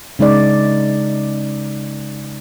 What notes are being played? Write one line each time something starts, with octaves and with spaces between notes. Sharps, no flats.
C#3 G#3 D#4 D5